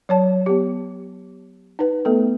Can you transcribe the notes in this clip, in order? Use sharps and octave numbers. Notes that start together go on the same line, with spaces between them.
F#3 C#5 A5
B3 G4
D#4 B4
A3 B3 A4